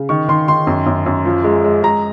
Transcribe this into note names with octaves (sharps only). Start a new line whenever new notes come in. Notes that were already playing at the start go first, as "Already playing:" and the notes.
Already playing: C#3
D#3 C#6
D#3 C6
D#3 C6
F#2
F#2
F#2
F3
G#3
G#3
G#3 A#5